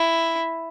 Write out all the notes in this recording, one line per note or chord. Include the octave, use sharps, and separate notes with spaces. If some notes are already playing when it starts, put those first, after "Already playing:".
Already playing: E4